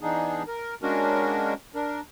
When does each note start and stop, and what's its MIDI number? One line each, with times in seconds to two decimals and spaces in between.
0.01 0.43 52
0.01 0.43 59
0.01 0.43 62
0.01 0.43 63
0.01 0.43 68
0.48 0.75 70
0.82 1.54 56
0.82 1.54 58
0.82 1.54 61
0.82 1.54 62
0.82 1.54 66
0.82 1.54 70
1.75 2.01 62
1.75 2.01 70